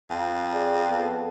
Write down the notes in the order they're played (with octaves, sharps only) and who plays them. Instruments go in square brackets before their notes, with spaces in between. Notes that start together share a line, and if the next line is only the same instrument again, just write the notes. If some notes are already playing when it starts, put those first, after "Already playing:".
[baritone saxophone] F2
[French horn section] G#4 D5
B3 A4